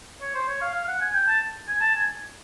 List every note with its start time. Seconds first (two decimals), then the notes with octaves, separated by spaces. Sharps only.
0.21 C#5
0.35 C5
0.48 C#5
0.61 F5
0.74 F5
0.88 F#5
1.01 G#5
1.14 G5
1.28 A5
1.68 G#5
1.81 A5
1.95 G#5